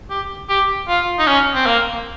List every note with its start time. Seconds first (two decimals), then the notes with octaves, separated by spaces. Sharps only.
0.10 G4
0.49 G4
0.88 F4
1.19 D#4
1.27 C#4
1.54 C4
1.66 A#3